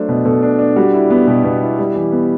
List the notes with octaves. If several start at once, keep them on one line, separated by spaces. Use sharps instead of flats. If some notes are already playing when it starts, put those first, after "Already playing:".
Already playing: F#3 A3 D4 C5
B2
B2 A4
D4
D4
G3 F#4
E4
B3
B2 G4
B2
E4
G3
E3
B3